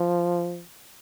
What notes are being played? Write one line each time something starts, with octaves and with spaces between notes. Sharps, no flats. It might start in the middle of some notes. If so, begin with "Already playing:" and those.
Already playing: F3